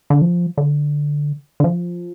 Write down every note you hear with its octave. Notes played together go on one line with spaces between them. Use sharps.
D3
F3
D3
D3
F3